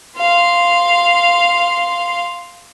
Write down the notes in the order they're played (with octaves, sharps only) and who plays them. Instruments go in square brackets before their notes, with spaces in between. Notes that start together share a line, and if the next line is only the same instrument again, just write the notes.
[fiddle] F5 C6